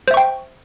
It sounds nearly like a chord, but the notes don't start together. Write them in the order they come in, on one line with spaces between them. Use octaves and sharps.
C5 E5 C#6 G5